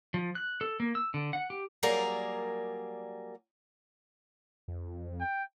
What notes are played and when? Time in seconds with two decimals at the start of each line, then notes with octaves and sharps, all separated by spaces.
0.14 F3
0.35 F#6
0.61 A4
0.80 A#3
0.95 E6
1.14 D3
1.33 F#5
1.50 G4
1.83 F#3 G3 A#3 G#4 A#4 D5
4.68 F2
5.20 G5